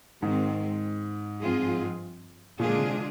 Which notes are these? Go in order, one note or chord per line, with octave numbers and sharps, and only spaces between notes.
G#2 D#3 G#3 C4
G2 F3 C4 F4 G#4
A#2 D3 G#3 D4 F4 G#4
C3